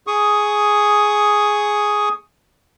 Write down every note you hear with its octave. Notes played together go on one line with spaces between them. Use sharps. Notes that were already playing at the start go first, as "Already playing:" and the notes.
G#4 C#6 D#6